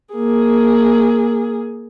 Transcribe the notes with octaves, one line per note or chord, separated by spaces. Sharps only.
A#3 G#4